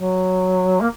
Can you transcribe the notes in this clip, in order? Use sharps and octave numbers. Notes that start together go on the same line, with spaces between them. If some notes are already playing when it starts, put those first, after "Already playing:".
Already playing: F#3
A#3